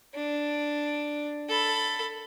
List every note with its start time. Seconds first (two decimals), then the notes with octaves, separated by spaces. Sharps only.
0.14 D4
1.49 A4 B5